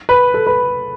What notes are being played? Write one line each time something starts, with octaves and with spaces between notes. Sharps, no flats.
B4
A4
B4